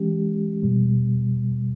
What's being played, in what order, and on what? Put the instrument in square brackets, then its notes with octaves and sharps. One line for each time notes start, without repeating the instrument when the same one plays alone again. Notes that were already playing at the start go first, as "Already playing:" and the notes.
Already playing: [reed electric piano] E3 G#3 C#4 G4
E2 B2 G3